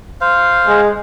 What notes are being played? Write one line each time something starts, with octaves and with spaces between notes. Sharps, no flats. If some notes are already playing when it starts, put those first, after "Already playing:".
C5 F5
G#3